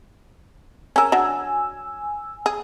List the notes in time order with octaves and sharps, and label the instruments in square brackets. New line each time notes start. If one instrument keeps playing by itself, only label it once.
[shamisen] C#4 A#4 [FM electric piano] G#5 E6
[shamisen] F#3 D4
G#4